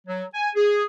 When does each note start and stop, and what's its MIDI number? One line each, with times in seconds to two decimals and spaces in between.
0.08 0.23 54
0.34 0.49 80
0.56 0.84 68